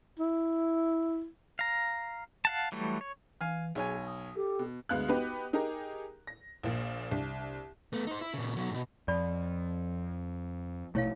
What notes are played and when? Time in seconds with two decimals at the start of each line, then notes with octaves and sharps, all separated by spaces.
0.19 E4
1.59 F5 A#5
2.45 F5 F#5 A5
2.72 E3 F#3 G3 A3
3.01 C#5
3.41 E3 F5 G#5 F6
3.75 B1 G#4 C#5 G#5
4.07 D#6
4.36 G4 A4
4.59 B2
4.89 D2 G#3 B3 F5 F#6
5.08 B3 D#4 F#4 G4 B4
5.53 D#4 G4 G#4 A#4 A#5
6.27 A#6
6.63 A#1 A#2
7.11 C2 D4
7.93 A3 B3
8.07 D#4 C5
8.21 E4
8.34 A#2 C#3
8.56 B1 F#3
8.70 G#2 B2
9.08 F2 D5 B5
10.95 A#1 B2 A3 E4 C#5 F5